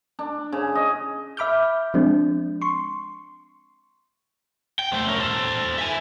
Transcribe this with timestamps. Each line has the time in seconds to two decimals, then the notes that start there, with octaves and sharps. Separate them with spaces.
0.19 D4
0.52 C#3
0.75 D#5
1.37 E5 B5 D6 F6 G6
1.94 F3 G#3 C4 D4
2.62 C6 C#6
4.79 G5
4.92 A3 C5
5.07 C#4 A#4
5.19 A4 C5
5.78 E5 G#5